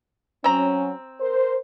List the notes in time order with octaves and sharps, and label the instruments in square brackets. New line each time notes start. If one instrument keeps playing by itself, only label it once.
[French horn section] F#3 C#4 [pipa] C4 A#5
[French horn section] A#4 C5